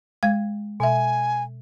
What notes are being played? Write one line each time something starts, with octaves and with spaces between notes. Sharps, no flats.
G#3 F5 G#6
B2 E5 G#5